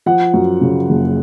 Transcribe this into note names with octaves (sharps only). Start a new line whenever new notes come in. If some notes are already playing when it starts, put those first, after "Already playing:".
F3 F#5
F#2
C#3
F#1